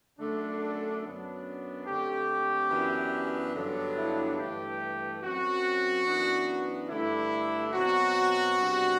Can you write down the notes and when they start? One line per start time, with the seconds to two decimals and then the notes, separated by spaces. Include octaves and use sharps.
0.18 F#2 D3 A3 D4
1.02 F#2 F#3 B3 D4
1.86 D3 A3 C4 G4
2.70 F#2 E3 B3 D4
3.54 G2 D3 F#3 B3 D4
3.96 E4
4.38 G2 E3 A3 G4
5.21 F#2 F#3 C4 F#4
6.05 F#2 E3 B3 D4
6.89 G2 D3 A3 D4 E4
7.73 B2 F#3 C4 F#4
8.57 C3 G3 B3 D4